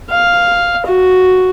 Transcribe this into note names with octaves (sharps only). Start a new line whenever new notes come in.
F5
F#4